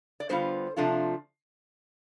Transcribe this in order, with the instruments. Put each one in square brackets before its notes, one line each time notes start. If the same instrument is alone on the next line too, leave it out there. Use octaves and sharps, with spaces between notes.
[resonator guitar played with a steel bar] D5
D3 G3 B3 F4 C5
C3 F3 A3 D4 F4